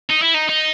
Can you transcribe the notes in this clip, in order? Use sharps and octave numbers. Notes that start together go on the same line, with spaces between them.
D#4
E4
D#4
D#4